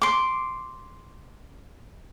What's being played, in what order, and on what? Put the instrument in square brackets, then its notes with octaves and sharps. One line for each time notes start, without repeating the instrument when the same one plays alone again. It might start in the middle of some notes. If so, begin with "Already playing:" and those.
[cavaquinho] C6 D6